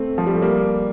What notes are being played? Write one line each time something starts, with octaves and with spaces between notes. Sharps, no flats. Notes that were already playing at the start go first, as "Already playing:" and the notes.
Already playing: A3 C4
F3
G3
A3
G3 A#3